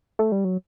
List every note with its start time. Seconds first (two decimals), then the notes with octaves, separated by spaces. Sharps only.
0.19 A3
0.32 G3
0.45 F#3